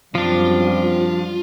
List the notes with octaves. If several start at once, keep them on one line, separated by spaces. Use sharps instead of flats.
F#2 F3 G3 C4 D4 F4